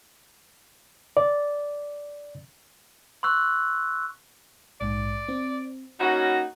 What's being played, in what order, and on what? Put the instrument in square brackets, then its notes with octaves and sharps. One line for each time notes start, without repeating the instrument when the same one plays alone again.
[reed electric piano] D5
[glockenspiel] C6 C#6 E6 F#6
[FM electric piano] A#1 G#2 [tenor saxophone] D5
[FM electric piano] C4
[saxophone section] A#3 D#4 F#4 [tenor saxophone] C#4 [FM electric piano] B5 C#6 G#6